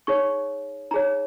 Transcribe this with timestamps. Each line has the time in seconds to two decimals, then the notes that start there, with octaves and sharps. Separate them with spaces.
0.07 D#4 G#4 C#5 C#6
0.91 D#4 G#4 C#5 A#5